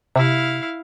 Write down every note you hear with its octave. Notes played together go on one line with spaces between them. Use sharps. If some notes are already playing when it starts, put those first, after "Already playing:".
C3 E4 F5